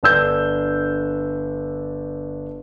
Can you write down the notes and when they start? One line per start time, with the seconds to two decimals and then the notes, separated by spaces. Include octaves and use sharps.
0.03 G1 D4 E6 G6